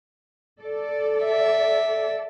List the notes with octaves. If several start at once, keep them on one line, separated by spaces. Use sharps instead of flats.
A4 D5
E5